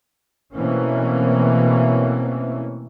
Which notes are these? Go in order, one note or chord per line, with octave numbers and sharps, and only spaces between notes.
B2 E3 A3 A#3 C4 C#4